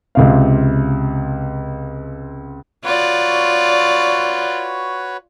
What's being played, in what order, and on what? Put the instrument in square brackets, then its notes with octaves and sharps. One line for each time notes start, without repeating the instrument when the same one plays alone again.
[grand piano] C#2 C3 F5
[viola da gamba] F4 D5 [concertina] F#4 B4 C#5